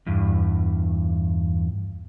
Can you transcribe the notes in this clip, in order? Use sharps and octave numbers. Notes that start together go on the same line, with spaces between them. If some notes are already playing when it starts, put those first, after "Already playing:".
E2 G2